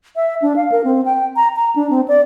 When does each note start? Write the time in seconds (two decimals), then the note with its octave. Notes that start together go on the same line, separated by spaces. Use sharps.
0.16 E5
0.42 D4
0.56 F5
0.72 A#4
0.84 C4
1.06 G5
1.36 A#5
1.56 A#5
1.76 D4
1.90 C4
2.08 D5